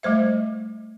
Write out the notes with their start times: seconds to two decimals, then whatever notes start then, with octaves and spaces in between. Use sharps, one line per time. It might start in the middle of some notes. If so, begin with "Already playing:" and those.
0.03 G3 A3 C5 E5